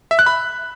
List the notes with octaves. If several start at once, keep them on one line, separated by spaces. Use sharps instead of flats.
E5
F#6
B5